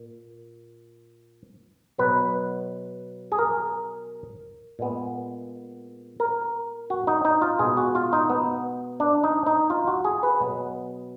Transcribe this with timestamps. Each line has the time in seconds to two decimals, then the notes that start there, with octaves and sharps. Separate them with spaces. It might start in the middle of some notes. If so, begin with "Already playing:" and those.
Already playing: A#2
1.98 B2 F#3 B3 B4
3.32 G#4
3.39 A#4
4.79 A#2 G#3 B3
6.20 A#4
6.90 F#4
7.07 D#4
7.25 D#4
7.42 F4
7.59 B2 G#3 B3 G#4
7.77 F#4
7.95 F4
8.13 D#4
8.29 B3
9.00 D4
9.24 D#4
9.46 D#4
9.70 F4
9.87 F#4
10.05 G#4
10.23 B4
10.40 B2 F#3 B3